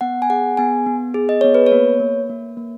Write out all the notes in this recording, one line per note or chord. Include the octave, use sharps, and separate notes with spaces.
B3 F#5
G#5
G#4 F#5
B3 G#5
B3
G#4
D#5
B3 C#5
B4
C#5
A#3
A#3
A#3
A#3